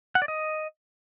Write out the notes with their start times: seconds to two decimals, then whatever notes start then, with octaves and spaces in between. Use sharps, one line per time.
0.15 F#5
0.22 D5
0.28 D#5